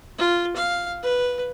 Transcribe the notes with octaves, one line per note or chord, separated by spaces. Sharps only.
F4
F5
B4